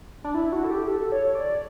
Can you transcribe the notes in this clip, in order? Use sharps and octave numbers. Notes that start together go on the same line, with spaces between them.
D4
E4
F#4
A4
G4
A4
C#5
D5